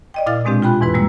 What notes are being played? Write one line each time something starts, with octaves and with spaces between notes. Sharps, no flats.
D5 D#5 G5
A#2 E4 F5 F6 A6
B2 G#3 C4 D4 G4
F4 G5 B5 F#6
E2 G#2 E3 E4 B4
G3 G#3 A#3 E6